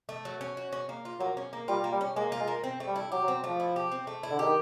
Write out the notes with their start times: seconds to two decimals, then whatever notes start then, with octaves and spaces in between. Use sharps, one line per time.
0.09 A3
0.25 F#3
0.41 C#4
0.57 F#4
0.73 C#4
0.89 A#3
1.05 F4
1.20 F#3 A#3
1.37 C#4
1.53 A#3
1.68 G3 F4
1.84 A#3
1.92 G3
2.01 C#4
2.16 G#3 A#3
2.32 F4
2.40 G#3
2.48 A#3
2.64 C4
2.80 A3
2.87 G3
2.96 E4
3.12 F#3 G4
3.23 F#3
3.28 C4
3.44 F3 A3
3.60 E4
3.76 G4
3.92 C4
4.07 A3
4.23 E4
4.31 D3
4.39 D#3 G4